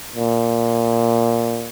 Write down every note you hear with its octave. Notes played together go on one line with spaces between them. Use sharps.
A#2